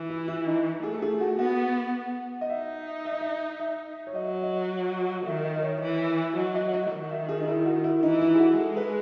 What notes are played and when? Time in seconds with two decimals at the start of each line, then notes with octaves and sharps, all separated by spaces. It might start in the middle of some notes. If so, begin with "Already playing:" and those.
Already playing: E3
0.10 E4
0.28 E4
0.47 D#4
0.83 A3 G#4
0.93 A4
1.02 G#4
1.20 F#4
1.39 B3 F#4
2.41 D#5
2.49 D#4 E5
3.05 E5
3.13 D#5
3.21 E5
3.60 E5
4.07 C#5
4.15 F#3 D#5
4.35 C#5
4.43 D#5
5.26 D#3 E5
5.44 D#5
5.55 D#5
5.63 C#5
5.81 E3
6.37 F#3 D#5
6.55 D#5
6.73 D#5
6.92 D#3
7.11 E5
7.29 G#4
7.41 D#4
7.48 E4
7.66 F#4
7.84 E4
8.03 E3 D#4
8.21 E4
8.35 G#4
8.40 F#4
8.58 G#3 A4
8.77 B4